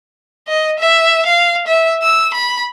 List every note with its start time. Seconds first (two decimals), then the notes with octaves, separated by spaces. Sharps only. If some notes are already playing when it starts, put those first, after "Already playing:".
0.48 D#5
0.79 E5
1.26 F5
1.67 E5
2.02 E6
2.34 B5